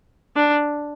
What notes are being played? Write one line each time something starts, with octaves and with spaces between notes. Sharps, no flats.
D4